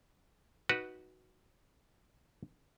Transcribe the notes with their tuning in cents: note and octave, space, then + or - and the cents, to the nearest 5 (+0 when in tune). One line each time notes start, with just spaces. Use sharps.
D#4 +0 F#4 +0 B4 -15